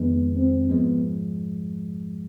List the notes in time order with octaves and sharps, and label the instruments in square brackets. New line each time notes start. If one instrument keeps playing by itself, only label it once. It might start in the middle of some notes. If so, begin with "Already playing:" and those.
Already playing: [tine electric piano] F2 D#3 G#3 D4 [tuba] B3
[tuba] C4
[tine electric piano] G#2 F3 G#3 [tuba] B3